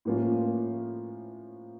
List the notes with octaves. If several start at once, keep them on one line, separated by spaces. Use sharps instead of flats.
A2 F3 A#3 C#4 F4